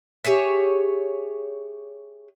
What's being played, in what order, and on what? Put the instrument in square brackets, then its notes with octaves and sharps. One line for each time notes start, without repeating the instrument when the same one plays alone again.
[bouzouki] G4 G#4 C#5 E5